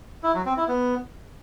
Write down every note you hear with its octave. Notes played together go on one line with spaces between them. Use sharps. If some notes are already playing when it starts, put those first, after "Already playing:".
E4
F#3
C4
E4
B3